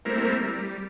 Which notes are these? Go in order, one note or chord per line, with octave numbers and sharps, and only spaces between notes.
G3 A3 A#3 C4 E4 A#4
G3